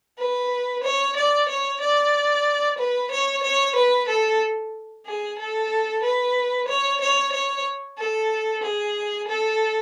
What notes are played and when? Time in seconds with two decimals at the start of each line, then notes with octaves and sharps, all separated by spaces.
0.19 B4
0.83 C#5
1.16 D5
1.49 C#5
1.81 D5
2.78 B4
3.11 C#5
3.43 C#5
3.76 B4
4.08 A4
5.06 G#4
5.39 A4
6.03 B4
6.68 C#5
7.01 C#5
7.32 C#5
7.98 A4
8.63 G#4
9.28 A4